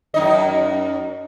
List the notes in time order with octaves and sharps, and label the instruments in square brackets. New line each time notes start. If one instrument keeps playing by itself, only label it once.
[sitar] F#2 D#4 D#5